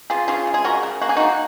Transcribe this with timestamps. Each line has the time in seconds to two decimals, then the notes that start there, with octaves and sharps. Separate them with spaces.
0.10 C#3 F4 G#4
0.28 C#3 F4 G#4
0.47 G#3
0.54 G#4
0.64 C#3 F#4 A#4
0.83 C#3
1.02 A#3 F#4
1.09 G#4
1.16 A#3 D#4 F#4